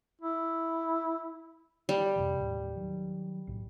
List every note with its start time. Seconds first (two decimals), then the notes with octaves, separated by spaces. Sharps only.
0.21 E4
1.89 G3
2.16 F2 C3 E3
2.39 D#2 A2
2.77 D#3 F#3
3.47 B1 A2